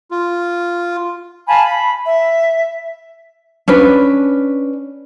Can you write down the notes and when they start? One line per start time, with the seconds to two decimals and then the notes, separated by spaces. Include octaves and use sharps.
0.11 F4
1.47 F5 G#5 A5 B5
1.62 B5
2.05 E5
3.68 C#4 D4 B4